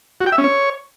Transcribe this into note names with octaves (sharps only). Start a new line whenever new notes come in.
F#4
G5
E5
C#4
C#5